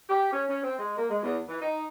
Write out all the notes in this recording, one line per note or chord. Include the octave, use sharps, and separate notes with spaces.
G4
C#4
C#4
C4
G#3
A#3
G#3
E2
E3
D#4